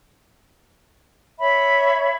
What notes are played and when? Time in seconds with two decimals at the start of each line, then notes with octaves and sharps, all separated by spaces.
1.40 C#5 E5 B5